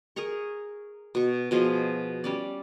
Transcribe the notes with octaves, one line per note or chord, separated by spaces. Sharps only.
G#4 A#4 A#5 C#6
B2 C#6
B2 F3 G#4 D#5
G3 C#4 D5